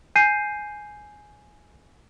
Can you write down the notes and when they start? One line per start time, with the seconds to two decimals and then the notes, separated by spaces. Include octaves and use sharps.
0.16 G#5 G6 C7 D#7